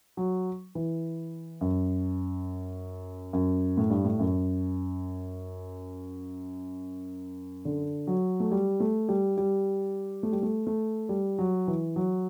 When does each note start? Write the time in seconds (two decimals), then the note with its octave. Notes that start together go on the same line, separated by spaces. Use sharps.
0.17 F#3
0.75 E3
1.61 F#2
3.33 F#2
3.77 A2
3.90 G2
4.05 A2
4.19 F#2
7.65 D3
8.07 F#3
8.40 A3
8.52 G3
8.80 A3
9.09 G3
9.37 G3
10.23 A3
10.33 G3
10.43 A3
10.67 A3
11.09 G3
11.38 F#3
11.68 E3
11.96 F#3